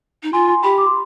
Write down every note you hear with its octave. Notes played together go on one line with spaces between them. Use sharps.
D#4
F4 G#5 C6
G#5 C6
G4 G5 B5
D6
C6